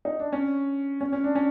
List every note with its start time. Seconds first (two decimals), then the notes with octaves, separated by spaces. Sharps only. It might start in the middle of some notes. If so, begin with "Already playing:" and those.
0.05 D#4
0.20 D4
0.32 C#4
1.01 C#4
1.13 C#4
1.24 D4
1.35 C#4